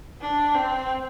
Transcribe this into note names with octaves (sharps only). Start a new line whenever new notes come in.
D4
C4